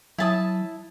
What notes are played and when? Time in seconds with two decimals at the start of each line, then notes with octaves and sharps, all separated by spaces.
0.18 F#3 E4 A5 D#6